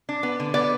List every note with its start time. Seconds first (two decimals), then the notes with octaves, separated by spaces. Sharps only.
0.09 D4
0.23 B3
0.40 D3
0.54 B3 D5